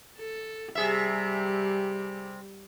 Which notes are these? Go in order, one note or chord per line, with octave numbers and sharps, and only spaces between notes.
A4
C3 G3 G#4 E5